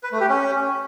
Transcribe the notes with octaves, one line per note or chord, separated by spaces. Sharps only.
B4
A3
G4
C#4